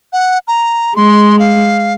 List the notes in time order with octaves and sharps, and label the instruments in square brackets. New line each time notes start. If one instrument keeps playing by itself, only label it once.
[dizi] F#5
A#5
[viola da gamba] G#3 [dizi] C6
[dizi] F5